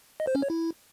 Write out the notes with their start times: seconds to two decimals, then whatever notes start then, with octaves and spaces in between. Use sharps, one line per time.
0.20 D#5
0.27 C5
0.35 C#4
0.42 C#5
0.50 E4